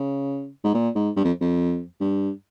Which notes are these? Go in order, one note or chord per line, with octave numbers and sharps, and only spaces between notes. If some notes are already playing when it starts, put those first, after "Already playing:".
Already playing: C#3
G#2
A#2
G#2
G2
F2
F2
G2